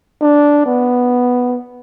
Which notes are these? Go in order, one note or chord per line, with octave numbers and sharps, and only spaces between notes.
D4
B3